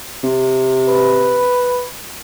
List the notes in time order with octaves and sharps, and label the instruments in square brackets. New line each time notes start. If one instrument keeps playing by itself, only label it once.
[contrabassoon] C3
[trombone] B4